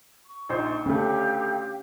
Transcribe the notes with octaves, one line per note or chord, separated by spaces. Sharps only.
C#6
A#1 D#4 C5
D2 A3 C#4 G4 F5 G5